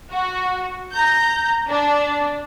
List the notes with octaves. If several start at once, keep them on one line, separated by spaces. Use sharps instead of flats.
F#4
A#5 G6
D4